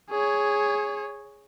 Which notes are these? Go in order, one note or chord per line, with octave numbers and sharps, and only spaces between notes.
G#4 C#5